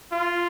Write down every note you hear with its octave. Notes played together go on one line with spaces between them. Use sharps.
F4